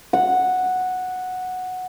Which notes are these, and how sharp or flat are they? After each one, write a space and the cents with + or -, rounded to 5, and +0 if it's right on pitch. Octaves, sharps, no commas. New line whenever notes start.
F#5 -5